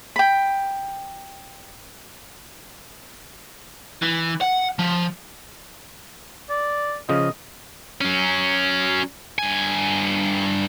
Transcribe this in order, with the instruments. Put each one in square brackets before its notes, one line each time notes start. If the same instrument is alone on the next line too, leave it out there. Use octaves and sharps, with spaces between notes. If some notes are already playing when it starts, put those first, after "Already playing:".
[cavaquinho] G5 B5
[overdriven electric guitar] E3
F#5
F3
[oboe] D5
[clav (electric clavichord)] C#3 F3 [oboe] D#5
[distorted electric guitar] F#3 C#4
G2 G#5